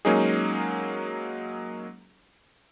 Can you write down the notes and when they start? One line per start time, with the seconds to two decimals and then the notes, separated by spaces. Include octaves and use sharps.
0.05 F#3 G#3 A#3 C#4 D#4 G#4